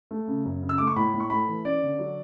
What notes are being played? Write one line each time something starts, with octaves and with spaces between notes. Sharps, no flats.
A3
C#3
F#2
C#3
E6
A3 D6
C#6
A2 B5
A2
C#6
A3 B5
E3
C#4 D5
D3
F#3